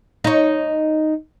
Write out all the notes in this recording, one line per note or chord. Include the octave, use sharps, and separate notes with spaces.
D#4 C#5